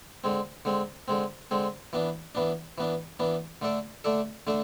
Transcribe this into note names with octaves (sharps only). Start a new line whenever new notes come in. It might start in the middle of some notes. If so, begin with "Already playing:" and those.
D3 G#3 C4
D3 G#3 C4
D3 G#3 C4
D3 G#3 C4
E3 B3 D4
E3 B3 D4
E3 B3 D4
E3 B3 D4
D3 A3 D4 A4 D5
D3 A3 D4 A4 D5
D3 A3 D4 A4